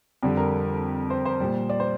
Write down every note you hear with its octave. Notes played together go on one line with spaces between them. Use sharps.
F2 D3 G3
A#4
C5
C5
A#2 G3
D5
C5